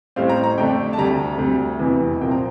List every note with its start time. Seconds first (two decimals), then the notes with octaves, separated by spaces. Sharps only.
0.16 A1 A2 G3 C4 F5
0.29 A#5
0.44 A#5
0.58 F2 D3 A3 D4 G5
0.93 A5
0.98 D2 C3 G3 A#5
1.38 D2 C3 G3
1.79 F1 E2 C3 E3
2.21 C2 A#2 F3 C4 G5
2.31 A#5